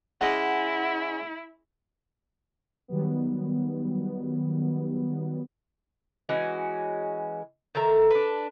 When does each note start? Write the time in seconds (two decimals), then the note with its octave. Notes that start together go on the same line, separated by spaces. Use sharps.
0.21 G#3 C#4 E4 D#5 F#5
2.88 D#3 F#3 G3 B3
6.29 E3 G#3 C#4 F#4
7.75 D#3 A4 E5 A#5
8.11 D4 B4